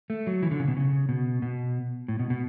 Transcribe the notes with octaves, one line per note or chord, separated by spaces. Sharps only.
A3
F#3
E3
D3
C#3
B2
C#3
B2
B2
A2
B2
B2